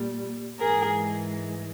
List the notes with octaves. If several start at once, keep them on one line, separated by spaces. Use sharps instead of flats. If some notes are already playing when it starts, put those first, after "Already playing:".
Already playing: A#2 G3
G#2 E3 G#3 G#4 A#4